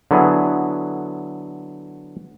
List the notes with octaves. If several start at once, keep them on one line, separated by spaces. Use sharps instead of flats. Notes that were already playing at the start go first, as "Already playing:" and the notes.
D3 F#3 B3 E4 G#4